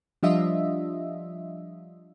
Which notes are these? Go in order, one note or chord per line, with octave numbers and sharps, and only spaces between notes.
F3 G3 D4 F4 D#5 E5